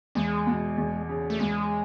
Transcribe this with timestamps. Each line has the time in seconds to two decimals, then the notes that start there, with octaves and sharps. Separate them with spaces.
0.15 E2 G#3
0.47 B2
0.78 E2
1.09 C#3
1.30 A3
1.40 E2 G#3